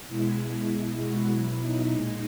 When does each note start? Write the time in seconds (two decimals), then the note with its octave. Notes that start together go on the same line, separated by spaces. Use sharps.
0.08 B2 G#3 E4
0.39 E4
0.69 B2 G#3
1.00 F#4
1.30 B2 F#3 E4
1.61 D#4
1.91 A#2 G#3